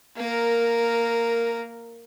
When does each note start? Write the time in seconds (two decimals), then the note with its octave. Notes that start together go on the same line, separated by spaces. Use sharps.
0.17 A#3 A#4